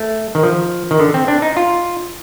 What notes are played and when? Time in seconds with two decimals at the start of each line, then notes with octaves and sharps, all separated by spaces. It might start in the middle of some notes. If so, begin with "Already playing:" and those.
Already playing: A3
0.35 D#3
0.43 F3
0.91 D#3
1.00 D3
1.14 C4
1.28 D4
1.42 D#4
1.57 F4